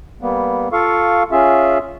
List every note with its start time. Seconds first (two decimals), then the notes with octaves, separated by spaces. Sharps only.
0.21 G3 A#3 B3
0.73 F4 A4 F5 C#6
1.32 C#4 F4 G#4 E5